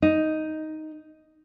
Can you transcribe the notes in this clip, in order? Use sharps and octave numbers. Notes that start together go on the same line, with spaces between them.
D#4